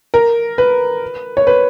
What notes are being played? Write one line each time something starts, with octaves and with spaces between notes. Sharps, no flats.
A#4
B4
C#5
B4